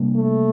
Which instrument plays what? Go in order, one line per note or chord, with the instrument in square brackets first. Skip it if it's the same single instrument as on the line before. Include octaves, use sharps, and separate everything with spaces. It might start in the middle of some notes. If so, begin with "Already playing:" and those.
Already playing: [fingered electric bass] C3 G3 A#3 D4
[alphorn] A3